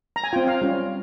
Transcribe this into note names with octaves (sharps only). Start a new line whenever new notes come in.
A#5
G#5
C4 F4 G5
F5
G3 C#4 F4